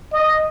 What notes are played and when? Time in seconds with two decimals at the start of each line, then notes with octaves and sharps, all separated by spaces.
0.13 D#5